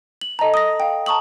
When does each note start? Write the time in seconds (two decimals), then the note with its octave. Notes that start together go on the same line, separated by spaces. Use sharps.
0.21 F#7
0.39 A4 D#5 A5 A#5
0.54 D#6 A#6
0.80 F5 G5
1.06 A5 A#5 C#6 D#6 F#7